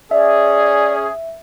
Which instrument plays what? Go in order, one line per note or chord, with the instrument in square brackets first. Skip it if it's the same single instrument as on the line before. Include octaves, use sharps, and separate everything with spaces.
[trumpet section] C#4 G#4 [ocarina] D5 [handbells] E5